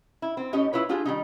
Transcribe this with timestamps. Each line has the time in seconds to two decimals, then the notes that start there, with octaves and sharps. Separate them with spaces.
0.22 E4
0.37 C4
0.53 A2 C#4 D#4 G4 C#5 D#5
0.73 E4 F4 B4 C#5
0.89 D4 F4 G4 G#4
1.05 D#3 G3 D#4